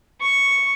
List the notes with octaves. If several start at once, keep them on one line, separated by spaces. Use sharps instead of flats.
C#6